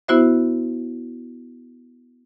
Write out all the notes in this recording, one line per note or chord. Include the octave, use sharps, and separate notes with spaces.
B3 E4 F#4 C5 E5